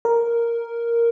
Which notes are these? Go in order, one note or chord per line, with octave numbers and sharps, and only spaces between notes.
A#4